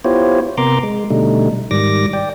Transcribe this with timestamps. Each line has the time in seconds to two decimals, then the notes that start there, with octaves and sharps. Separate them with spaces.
0.05 B3 E4 F4 G4 C5 C#5
0.58 C3 B3 A#4 A#5 C6 D6
0.83 G#3
1.10 B2 D3 G3 A3 D#4
1.71 G#2 D#3 G3 D6 A#6
2.13 D5 G5